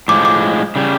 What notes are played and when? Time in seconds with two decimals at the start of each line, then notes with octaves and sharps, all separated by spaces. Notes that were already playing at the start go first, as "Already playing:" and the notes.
0.08 A2 F3 G#3 D6
0.25 D6
0.76 C#3 G3